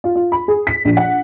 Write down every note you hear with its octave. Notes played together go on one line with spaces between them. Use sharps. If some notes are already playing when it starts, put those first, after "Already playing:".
F4
F4
B5
G#4
B6
A#1
F#5